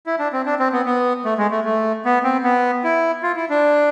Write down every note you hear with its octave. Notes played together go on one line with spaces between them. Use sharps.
E4
D4
C4
D4
C4
B3
B3
A3
G#3
A3
A3
B3
C4
B3
E4
F4
E4
D4